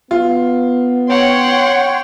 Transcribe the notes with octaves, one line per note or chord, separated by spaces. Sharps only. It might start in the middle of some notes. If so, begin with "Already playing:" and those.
B3 F4
C#5 F#5 G5 C6